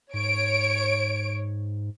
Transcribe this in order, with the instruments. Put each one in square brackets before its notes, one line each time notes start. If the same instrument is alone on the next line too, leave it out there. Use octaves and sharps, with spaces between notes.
[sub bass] G#2 [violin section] C#5 D7